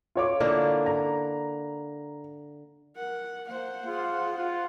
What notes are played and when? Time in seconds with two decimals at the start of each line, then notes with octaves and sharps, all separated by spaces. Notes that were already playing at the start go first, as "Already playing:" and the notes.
0.15 F4 C#5 D6
0.40 D3 A#3 E4
0.86 A#5
2.96 A#4 F#5
3.47 A#3 C5 F#5
3.86 F4 G#4
4.38 F4